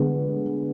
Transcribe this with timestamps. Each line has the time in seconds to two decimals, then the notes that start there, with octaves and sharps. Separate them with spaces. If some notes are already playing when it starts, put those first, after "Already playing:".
Already playing: D3 G#3 B3